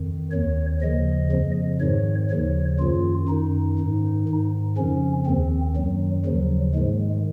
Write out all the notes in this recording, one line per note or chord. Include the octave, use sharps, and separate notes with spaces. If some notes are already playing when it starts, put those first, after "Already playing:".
Already playing: F2 D#3
D#2 D#3 C#5
D#2 C#3 F3 D#5
F2 C#3 F3
G#2 D#3 C#5
D#2 C#3 F3 C#5
F#2 D#3 F4
F#2 D#3 D#4
G#2 D#3
G#2 D#3
F2 C#3 F3 C#4
D#2 D#3 C4
F#2 D#3 F#3
D#2 C#3 F3 F#3
G#2 D#3 G#3